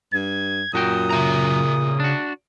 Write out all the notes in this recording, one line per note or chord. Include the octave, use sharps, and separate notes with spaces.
G2 G#6
F#2 A#2 F#4 G5 D#6
C#3 E5 A#5
D4 F#4